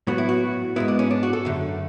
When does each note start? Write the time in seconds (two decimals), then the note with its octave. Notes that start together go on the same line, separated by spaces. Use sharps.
0.07 A2 F#3 B3 F#4
0.18 E4
0.29 F#4
0.76 G#2 G#3 B3 E4
0.88 D4
0.99 C#4
1.11 D4
1.23 F#4
1.33 A4
1.45 F#2 D3 A3